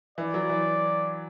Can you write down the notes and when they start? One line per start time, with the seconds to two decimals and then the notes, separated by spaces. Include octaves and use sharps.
0.18 E3 D5
0.34 F#3
0.49 E3